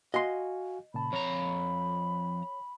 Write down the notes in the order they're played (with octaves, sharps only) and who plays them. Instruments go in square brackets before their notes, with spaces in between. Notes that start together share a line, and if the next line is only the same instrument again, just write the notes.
[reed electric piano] F#4 F5 G#5 [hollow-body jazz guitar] D#5 C6
[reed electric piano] A#2 C#3 A5 [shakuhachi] B5
[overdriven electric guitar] F2 A#5 [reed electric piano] C#5